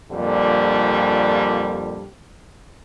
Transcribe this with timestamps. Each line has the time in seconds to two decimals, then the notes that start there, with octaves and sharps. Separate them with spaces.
0.11 F2 A#2 D3 G3